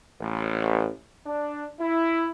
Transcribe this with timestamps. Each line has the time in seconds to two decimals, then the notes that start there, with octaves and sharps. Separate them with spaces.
0.21 A1
1.26 D4
1.80 E4